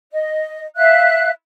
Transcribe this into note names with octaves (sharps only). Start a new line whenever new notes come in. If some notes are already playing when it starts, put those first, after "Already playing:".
D#5
E5 F5 F#6